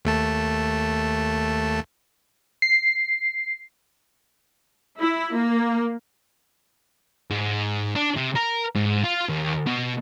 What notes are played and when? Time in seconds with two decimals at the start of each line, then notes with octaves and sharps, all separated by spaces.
0.05 D#2 A3 A5
2.62 C7
5.00 E4
5.35 A#3
7.31 G#2
7.95 D4
8.16 C3
8.35 A#4
8.75 G#2
9.04 F4
9.29 D#2
9.67 B2